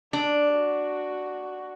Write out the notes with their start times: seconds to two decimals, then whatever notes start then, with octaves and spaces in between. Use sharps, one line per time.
0.13 D4 D5
0.55 F#4